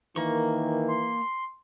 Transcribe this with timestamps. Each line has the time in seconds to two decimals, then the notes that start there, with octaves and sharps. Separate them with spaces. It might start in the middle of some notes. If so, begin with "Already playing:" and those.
0.16 D#3 E3 A#3 A#4 C#6
0.88 C6